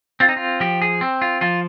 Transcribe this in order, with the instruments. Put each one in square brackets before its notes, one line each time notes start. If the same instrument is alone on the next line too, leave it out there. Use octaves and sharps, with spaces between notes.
[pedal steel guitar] C4 F4
D#4
F4
F3 G4
G#4
C4
F4
F3 F4